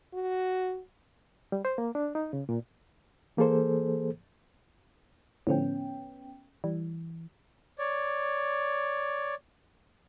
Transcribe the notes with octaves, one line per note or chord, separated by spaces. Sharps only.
F#4
G3
C5
A#3
D4
D#4
C#3
A#2
E3 A#3 G#4 A4 C5
A2 D3 F3 B3 C#4 G5
E3 G3
C#5 D5